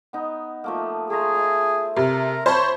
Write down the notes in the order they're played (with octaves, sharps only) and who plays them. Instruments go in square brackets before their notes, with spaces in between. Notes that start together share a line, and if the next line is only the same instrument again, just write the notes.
[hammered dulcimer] B3 D#4
F3 A3 A#3
[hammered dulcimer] A3 C5 A#5 [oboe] G#4
[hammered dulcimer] E5 A5
[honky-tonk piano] C3 [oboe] A#4
[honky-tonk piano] C5 A5 B5 [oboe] C#5